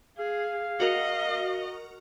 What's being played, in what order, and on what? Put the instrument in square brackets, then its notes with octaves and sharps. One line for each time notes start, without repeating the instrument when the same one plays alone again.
[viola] G#4 [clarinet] F5
[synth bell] F#4 A#4 [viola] D#5